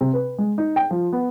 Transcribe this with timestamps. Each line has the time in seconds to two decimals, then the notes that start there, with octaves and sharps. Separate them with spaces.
0.01 C3
0.13 B4
0.38 G#3
0.58 D#4
0.76 G5
0.91 F3
1.13 B3